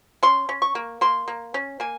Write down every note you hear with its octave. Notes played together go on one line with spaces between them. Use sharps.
C#4 C6
C#4
C#6
A#3
A#3 C6
A#3
C#4
A#3 G#5